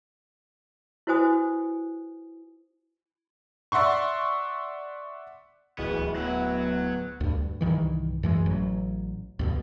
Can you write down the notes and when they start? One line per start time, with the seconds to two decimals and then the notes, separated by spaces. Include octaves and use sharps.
1.07 E4 F#4 B4 C5 G#5 D#6
3.72 D5 E5 F#5 C6 C#6
5.78 D1 E3 G#3 B3 B4
6.16 F#3 B3 E4 F#5
7.21 D2 G2
7.61 C2 G2 D#3 E3
8.23 F#2 E3 G#3
8.46 A1 F#3
9.39 D2 G2 B2